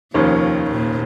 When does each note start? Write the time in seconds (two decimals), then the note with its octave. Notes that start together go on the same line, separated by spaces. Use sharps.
0.14 F1 D#2 D#3 F3 A#3 C#4
0.71 A#2